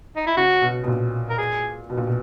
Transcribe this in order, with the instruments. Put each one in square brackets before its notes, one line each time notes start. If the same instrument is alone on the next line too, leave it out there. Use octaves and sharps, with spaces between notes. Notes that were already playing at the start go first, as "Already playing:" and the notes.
[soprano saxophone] D#4
E4
[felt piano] C#3 [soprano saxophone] F#4
[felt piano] B2
B2
A#2
[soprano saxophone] A#4
G#4
[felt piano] B2
A#2
B2